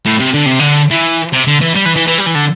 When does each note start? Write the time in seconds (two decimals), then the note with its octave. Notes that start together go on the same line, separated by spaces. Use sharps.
0.05 A2
0.20 C3
0.34 D3
0.46 C3
0.60 D3
0.91 E3
1.33 C3
1.47 D3
1.61 E3
1.75 G3
1.86 E3
1.96 E3
2.07 E3
2.18 G3
2.26 E3
2.35 D3